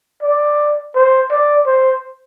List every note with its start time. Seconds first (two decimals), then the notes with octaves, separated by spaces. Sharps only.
0.23 D5
0.95 C5
1.31 D5
1.66 C5